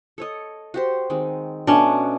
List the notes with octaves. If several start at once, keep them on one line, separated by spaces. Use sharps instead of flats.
A4 C#5 D#5
F#4 G4 C5
D#3 G#3 C4
B2 A3 C#4 D4